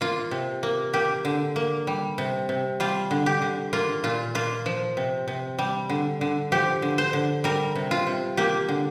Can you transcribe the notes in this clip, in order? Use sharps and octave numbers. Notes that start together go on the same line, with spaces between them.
A#3 F4
C3
A#3
A#3 G4
D3
A#3
G3
C3
C3
G3 F4
D3
G4
D3
A#3 F4
A#2 F4
A#3 F4
F3
C3
C3
G3
D3
D3
F3 G4
D3
C5
D3
G3 A#4
C3
F4
C3
A#3 G4
D3